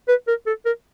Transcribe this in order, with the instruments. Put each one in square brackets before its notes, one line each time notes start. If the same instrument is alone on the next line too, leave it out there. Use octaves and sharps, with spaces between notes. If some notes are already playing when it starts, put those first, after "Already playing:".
[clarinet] B4
A#4
A4
A#4